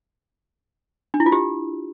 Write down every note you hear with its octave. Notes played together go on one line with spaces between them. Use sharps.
D4
E4
F4
G4